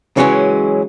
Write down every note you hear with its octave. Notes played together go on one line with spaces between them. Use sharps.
C#3 E3 F#3 G#3 C#4